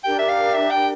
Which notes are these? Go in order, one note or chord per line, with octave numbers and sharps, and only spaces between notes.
D4 G4 A#4 G5
E5
F5
E5
G5